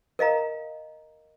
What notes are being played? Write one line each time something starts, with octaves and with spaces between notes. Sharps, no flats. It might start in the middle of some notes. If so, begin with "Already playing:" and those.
A#4 D#5 F5 A#5